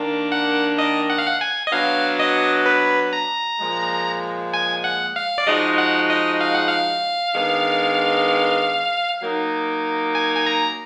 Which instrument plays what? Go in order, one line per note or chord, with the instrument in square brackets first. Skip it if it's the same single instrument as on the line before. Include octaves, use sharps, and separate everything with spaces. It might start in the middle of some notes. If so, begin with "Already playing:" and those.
Already playing: [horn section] D#3 A#3 D4
[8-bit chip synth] F#5
D#5
F#5
F5
F#5
G#5
D#5
[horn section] F#3 B3 D4 F#4 [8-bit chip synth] F5
[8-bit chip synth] D#5
B4
A#5
[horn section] A#2 F3 G#3
[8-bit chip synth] G#5
F#5
F5
D5
[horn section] F3 G#3 D#4 F#4 [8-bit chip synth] D#5
[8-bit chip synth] F#5
D#5
F5
F#5
F5
[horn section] D#3 G#3 B3 D4
F#3 A#3 D#4
[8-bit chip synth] G#5
G#5
A#5